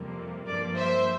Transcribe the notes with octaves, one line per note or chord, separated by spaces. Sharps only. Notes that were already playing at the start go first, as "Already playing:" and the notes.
Already playing: F2 C3 G3 A#3
G2 F3 A#3 A#4 D5
C5 E5